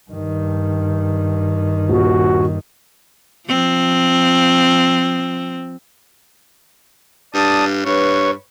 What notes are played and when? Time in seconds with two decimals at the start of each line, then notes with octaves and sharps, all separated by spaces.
0.10 G2 D#3
1.89 D#1 F#4
3.48 F3 C4
7.34 G2 D5 A5 D#6
7.86 G2 B4 C#5 C#6